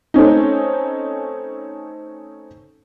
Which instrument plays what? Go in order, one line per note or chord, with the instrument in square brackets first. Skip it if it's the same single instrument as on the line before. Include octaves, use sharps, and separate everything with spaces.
[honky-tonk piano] A3 C4 C#4 D#4